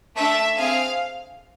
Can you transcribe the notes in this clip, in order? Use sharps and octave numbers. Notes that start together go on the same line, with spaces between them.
A3 D4 A4 E5
C4 G#4 F5